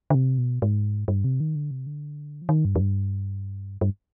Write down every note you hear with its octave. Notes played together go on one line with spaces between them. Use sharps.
D3
C3
B2
G#2
G2
C3
D#3
D3
C3
D3
F3
D#3
G2
F2
G2
G2